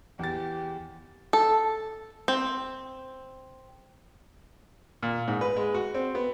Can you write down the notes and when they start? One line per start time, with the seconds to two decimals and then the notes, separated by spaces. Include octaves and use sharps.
0.19 E2 G4 A6
1.33 A4
2.28 C4
5.03 A#2
5.28 G#2
5.41 B4
5.56 G#3
5.74 F#4
5.94 C4
6.15 B3